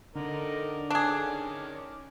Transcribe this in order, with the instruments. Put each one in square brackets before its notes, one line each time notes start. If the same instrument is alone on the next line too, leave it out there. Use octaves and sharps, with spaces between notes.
[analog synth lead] D3 [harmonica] D#4 A#4 D5
[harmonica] D#3 C#4 D6 [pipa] D4 G#4